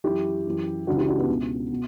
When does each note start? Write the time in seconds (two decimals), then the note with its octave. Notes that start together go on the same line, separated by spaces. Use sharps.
0.04 F#2 E3 E4 G4
0.46 F#2 E3
0.87 C#2 C#3 E3 D4 F#4
0.98 E4 G4
1.08 D4 F#4
1.18 B3 D4
1.29 C#2 B2
1.71 B2